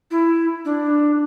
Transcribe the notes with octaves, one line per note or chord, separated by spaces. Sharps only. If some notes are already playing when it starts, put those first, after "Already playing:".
E4
D4